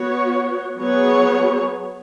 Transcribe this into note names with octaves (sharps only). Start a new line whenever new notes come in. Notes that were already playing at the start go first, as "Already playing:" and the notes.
Already playing: B3 F#4 C#5
F#3 B3 G#4 C#5